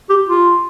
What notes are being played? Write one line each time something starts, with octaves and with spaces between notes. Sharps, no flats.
G4
F4